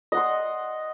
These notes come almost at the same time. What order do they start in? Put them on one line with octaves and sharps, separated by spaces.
D#5 F#5 C6